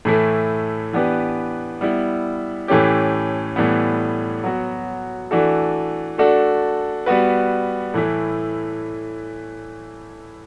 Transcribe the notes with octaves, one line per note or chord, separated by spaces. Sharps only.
A2 E3 A3 E4
E3 B3 D4 G4 B4
G3 B3 E4
A2 E3 A3 C#4 G4
A2 E3 G3 B3
F#3 B3 F#4
E3 A3 D4 F#4 A4
A3 D4 F#4 A4
G3 B3 F#4 B4
A2 E3 A3 E4